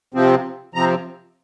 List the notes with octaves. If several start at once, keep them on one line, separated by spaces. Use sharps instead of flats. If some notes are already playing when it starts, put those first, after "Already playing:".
C3 F3 C4
C3 F3 C4 A#5